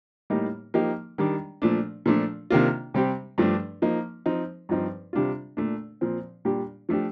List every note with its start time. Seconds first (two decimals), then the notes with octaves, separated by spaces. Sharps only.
0.30 A2 G3 A#3 D#4 G4
0.74 F3 A#3 D#4 G4
1.18 D#3 G3 D4
1.62 A#2 F3 A3 D4
2.06 A#2 F3 A3 D4
2.51 C3 D#3 A#3 D4 F4
2.94 C3 G3 C4 G4
3.38 G2 F3 A3 D4
3.82 F3 A#3 D#4
4.26 F3 C4 D#4
4.69 G2 F3 C4 D#4
5.13 C3 G3 D4 F4
5.57 A#2 A3 D4
6.01 A#2 F3 C4
6.45 A#2 G3 D4 G4
6.89 F3 A3 D4 G4